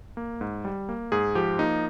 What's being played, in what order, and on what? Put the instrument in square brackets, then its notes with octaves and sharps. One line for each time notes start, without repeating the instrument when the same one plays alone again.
[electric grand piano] A#3
G#2
G3
A#3
G#2 G#4
F3 G4
A#3 D#4